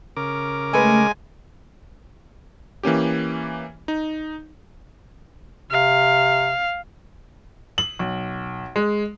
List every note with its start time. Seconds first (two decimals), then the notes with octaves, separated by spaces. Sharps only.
0.17 C#3 A#4 D6
0.73 G#3 A3 B4 G#5
2.83 E3 A#3 C#4 G4
3.88 D#4
5.71 C3 F5
7.78 F#7
7.99 B1
8.76 G#3